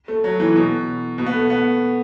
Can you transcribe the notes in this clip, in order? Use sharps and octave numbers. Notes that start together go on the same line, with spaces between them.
A3
F#3
E3
B2
B2
B3
A3
B3